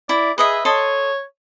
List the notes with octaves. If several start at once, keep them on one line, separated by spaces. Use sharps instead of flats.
E4 D5
G#4 B4 D#5 E5
A4 C#5 D#5 C6